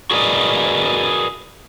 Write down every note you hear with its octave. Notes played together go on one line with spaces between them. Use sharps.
F#4 G#4 A#4 B4 D5 D#5